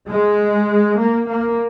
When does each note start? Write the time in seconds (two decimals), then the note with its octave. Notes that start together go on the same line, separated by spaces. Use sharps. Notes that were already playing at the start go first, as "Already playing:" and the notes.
0.09 G#3
0.98 A#3
1.28 A#3